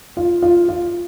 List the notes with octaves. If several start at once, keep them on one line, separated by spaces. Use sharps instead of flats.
F4
F4
F4